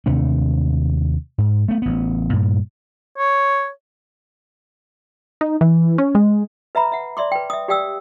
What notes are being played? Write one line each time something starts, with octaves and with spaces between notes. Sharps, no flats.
D#2 C3 A3 D4
G#2
A3 B3
A1 B3
G2 A#2
C#5
D#4
E3
C#4
G#3
B4 E5 A#5 B5
E5 F#5
D5 E5 C6 D6
B4 G5
E5 D#6
G4 D5 F5 G5 D#6 E6